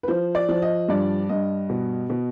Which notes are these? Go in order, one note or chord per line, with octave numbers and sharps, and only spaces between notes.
B4
F3 C5
D5
F3
D#5
G2 D5
G2 D#5
B2
B2